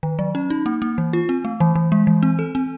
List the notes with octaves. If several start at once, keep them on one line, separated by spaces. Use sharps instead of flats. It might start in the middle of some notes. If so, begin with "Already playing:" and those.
D#3
F#3
C#4
D#4
A#3
A#3
E3
F4
C4
A3
E3
E3
G#3
E3
C4
A4
C4